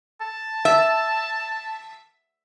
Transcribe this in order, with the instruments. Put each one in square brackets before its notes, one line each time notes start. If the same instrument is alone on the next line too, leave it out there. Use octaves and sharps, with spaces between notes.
[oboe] A5
[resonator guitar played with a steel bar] E5